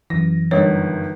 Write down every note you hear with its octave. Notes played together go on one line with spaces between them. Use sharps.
F#2 E3 A#6
G1 D2 D#3 G3 C#5